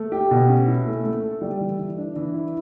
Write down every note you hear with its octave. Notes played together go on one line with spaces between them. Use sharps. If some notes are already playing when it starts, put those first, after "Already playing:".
Already playing: A3
G4
B2
C#4
E4
A3
A3
A4
G3
E3
E3
D4
E3
E4